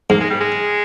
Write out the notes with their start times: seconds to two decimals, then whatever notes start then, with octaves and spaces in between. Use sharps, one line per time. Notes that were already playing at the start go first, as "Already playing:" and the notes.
0.10 G#2 A#3
0.20 G#3
0.30 G3
0.40 G#3